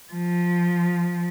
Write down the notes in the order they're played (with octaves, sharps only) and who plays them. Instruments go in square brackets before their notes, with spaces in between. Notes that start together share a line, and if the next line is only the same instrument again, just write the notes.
[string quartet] F3